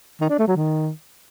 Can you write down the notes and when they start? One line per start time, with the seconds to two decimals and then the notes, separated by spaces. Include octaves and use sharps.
0.21 D#3
0.30 D4
0.38 A3
0.47 F#3
0.56 D#3